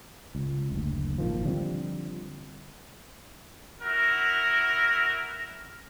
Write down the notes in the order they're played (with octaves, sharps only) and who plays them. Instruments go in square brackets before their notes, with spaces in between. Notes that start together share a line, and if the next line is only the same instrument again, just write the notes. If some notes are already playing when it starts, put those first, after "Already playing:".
[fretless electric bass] C#2
F#1 D2
G#1 A#2 D#3 F3
D3 F3 G3 C4
[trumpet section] E4 F#4 A#4